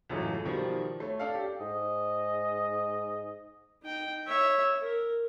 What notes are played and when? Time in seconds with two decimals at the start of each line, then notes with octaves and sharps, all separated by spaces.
0.09 C#2 F#2 A2 E3 A3
0.45 B2 D#3 F3 G3
1.00 A3 C#5
1.19 D4 A4 F5
1.35 G4
1.60 G#2 D#5
3.83 D#4 G5
4.27 C#5 E5
4.80 A#4